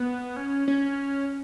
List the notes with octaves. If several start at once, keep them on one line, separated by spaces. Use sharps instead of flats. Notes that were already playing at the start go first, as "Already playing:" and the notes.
Already playing: B3
C#4
C#4